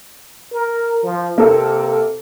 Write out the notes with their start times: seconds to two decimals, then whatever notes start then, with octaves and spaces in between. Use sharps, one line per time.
0.52 A#4
1.03 F3
1.38 C3 A#3 A4